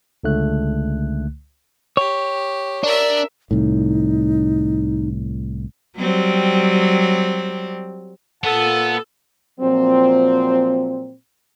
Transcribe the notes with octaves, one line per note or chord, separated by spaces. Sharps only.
C#2 D3 A3 F#6
G4 C#5
D4 A#4 E5
C2 A2 D#4
F#3 G3 C4
A#2 B3 A4 F#5 A5
A#2 F3 F#3 C4